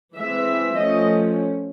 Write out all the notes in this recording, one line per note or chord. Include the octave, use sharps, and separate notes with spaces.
E3 G#3 C4 E5
F3 A3 C#4 D#5